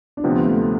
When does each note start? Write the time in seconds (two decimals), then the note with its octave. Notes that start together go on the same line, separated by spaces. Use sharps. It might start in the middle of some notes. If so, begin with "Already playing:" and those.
0.17 D4
0.24 D2 C3 F3 B3 C4 F4
0.46 A3